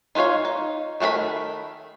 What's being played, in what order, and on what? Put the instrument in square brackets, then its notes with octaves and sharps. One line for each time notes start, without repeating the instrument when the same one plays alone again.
[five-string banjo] D#4 F4 B4 C#5 F5
D#4
D#3 A3 F#4 A#4 B5